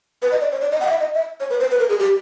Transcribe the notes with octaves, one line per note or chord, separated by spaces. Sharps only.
B4
D#5
D5
C#5
D5
D#5
F#5
F5
E5
D#5
E5
C#5
B4
C5
B4
A#4
G#4
G4